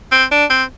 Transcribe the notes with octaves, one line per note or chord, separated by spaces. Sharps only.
C4
D4
C4